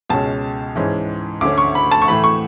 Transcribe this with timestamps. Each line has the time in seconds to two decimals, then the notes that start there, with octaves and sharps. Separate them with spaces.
0.10 C#2 B2 G#3 C#4 A5
0.75 G#2 E3 G#3 C#4
1.41 D2 D3 A3 C#4 D6
1.58 C#6
1.75 B5
1.91 A5
2.02 C#6
2.08 A2 E3 A3 B5
2.24 C#6